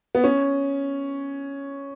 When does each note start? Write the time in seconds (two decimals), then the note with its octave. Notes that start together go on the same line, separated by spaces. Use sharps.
0.15 B3
0.24 C#4